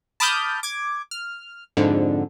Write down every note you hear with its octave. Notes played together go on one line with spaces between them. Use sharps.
A5 B5 D6 D#6 F6 G6
D6 G#6
F6
F2 G#2 D3